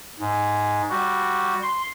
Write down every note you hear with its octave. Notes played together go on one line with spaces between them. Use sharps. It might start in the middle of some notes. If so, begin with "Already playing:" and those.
G#2
G3 F#4
C6